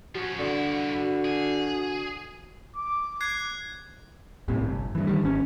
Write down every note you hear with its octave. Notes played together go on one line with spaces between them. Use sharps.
F3 C#4 F#4
G2 D3 E4
G#4
D6
F#6 G#6 C7
B1 A2 C3
G1
G2 E3
D#3 G3
G#1 C#4